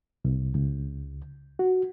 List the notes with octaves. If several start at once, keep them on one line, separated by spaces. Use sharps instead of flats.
C2
C#2
F#4